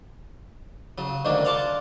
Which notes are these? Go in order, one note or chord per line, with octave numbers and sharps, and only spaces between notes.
C#3 F#3
D2 G#2 D#3 F#3 A#3 D4
D5 F5 F#5 A5 C6 D6